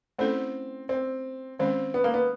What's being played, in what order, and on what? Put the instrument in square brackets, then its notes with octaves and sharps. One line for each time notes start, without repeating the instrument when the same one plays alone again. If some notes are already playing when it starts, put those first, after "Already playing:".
[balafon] A3 C#4 E4 A4 [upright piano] C4
[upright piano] C4
[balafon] D#3 G#3 C#4 [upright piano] C4
[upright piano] B3
A#3
B3